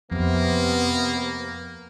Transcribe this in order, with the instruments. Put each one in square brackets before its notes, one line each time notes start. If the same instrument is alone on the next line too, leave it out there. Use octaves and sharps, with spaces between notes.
[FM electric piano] F2 [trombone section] C3 B3 [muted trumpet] A#3